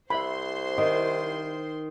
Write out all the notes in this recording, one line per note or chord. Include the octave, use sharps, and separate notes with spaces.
C2 C5 E5 B5 C6
D#3 D#5